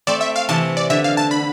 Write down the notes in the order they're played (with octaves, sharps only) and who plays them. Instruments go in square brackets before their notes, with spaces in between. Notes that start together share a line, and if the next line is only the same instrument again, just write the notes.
[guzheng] A3 C4 [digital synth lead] D5
[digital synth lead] E5
F5
[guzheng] C3 E3 [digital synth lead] A5
[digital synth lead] D5
[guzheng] D3 [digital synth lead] E5
[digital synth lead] F5
A5
B5